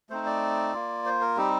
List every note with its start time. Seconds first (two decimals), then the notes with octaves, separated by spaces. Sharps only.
0.10 A3 C4 D#4 C5
0.26 D5
0.73 A#3 F4
1.06 C5
1.21 A#4
1.37 G3 C4 D#4 G4